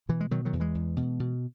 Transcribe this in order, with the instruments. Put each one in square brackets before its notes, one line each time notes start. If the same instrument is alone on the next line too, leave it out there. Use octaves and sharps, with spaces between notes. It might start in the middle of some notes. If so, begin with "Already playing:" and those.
[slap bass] B2 E3
G#3
B2 D#3 F#3
D#3 F#3
E2
E3 G#3
E2
B2
B2